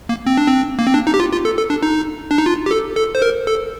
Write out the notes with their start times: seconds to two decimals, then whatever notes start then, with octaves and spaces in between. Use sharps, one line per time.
0.09 A#3
0.27 C4
0.37 D4
0.48 C4
0.79 A#3
0.87 C4
0.94 D4
1.07 D#4
1.14 G4
1.20 F4
1.32 F4
1.45 A4
1.58 A4
1.70 D4
1.83 D#4
2.31 D4
2.38 D#4
2.46 F4
2.66 G4
2.71 A4
2.96 A4
3.15 C5
3.22 A#4
3.47 A4